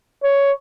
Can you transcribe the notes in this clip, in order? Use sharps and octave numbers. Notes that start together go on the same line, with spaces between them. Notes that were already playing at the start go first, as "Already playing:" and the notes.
C#5